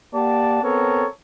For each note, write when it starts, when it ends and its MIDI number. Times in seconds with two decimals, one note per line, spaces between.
0.14 0.62 58
0.14 0.62 67
0.14 0.62 74
0.14 0.62 78
0.14 0.62 81
0.63 1.07 59
0.63 1.07 60
0.63 1.07 69
0.63 1.07 70
0.63 1.07 73